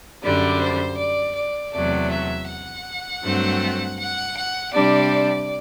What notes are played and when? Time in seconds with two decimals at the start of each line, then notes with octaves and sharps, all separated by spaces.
0.23 F#2 D3 G3 D5
0.61 C5
0.98 D5
1.35 D5
1.73 E2 C3 F#3 A3 D5
2.11 E5
2.48 F#5
3.24 G2 F#3 A3 C4
3.99 F#5
4.37 F#5
4.74 C3 G3 D4 D5